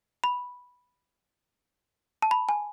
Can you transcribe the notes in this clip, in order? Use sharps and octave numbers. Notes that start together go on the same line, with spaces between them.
B5
A5
B5
G#5